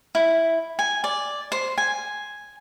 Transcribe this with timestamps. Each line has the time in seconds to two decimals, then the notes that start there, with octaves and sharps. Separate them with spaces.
0.15 E4
0.79 G#5
1.04 D5
1.52 C5
1.78 G#5